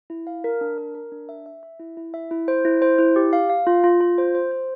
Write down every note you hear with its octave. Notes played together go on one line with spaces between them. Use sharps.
E4
F5
A#4
D4
A#4
A#4
D4
E5
E5
E5
E4
E4
E5
E4
C5
E4
C5
E4
G4
F5
F5
F4
F4
F4
C5
C5
C5